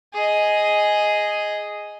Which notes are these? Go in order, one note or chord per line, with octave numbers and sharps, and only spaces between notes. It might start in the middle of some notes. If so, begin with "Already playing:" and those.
G#4 D#5